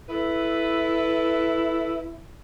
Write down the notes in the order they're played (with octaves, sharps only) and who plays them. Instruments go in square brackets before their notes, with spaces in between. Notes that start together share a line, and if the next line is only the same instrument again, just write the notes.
[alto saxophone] E4 [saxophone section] A4 B4